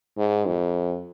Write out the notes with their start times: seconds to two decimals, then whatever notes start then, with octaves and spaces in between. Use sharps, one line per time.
0.17 G#2
0.47 F2